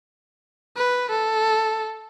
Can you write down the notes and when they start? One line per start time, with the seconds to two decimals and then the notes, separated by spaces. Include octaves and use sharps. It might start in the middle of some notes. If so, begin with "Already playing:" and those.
0.76 B4
1.10 A4